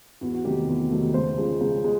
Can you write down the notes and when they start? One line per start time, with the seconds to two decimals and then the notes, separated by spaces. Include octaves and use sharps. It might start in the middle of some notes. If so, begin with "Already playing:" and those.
0.21 E2 F#4
0.33 F#4
0.44 C3 D#3 F#3 A3 G4
0.68 E2
0.90 C3 D#3 F#3 A3
1.14 C#2 C5
1.38 C#3 F3 G#3
1.61 C#2
1.84 G#3